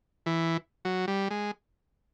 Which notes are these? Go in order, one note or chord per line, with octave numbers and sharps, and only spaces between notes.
E3
F#3
G3
G#3